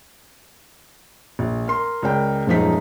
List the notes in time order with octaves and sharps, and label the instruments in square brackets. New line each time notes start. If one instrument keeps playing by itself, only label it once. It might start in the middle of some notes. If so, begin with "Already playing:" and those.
[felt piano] A#1
A#4 C6
C#2 C#3 A#4 D5 G5
D#1 F#2 F3 G#3 D#4 B6